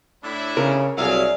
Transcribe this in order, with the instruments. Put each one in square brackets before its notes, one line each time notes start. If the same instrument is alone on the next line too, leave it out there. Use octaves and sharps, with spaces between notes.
[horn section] A2 D4 E4
[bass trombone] C#3 [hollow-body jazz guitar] A#4
[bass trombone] C2 [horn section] C3 F#3 F5 [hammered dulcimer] G#4 D5 E5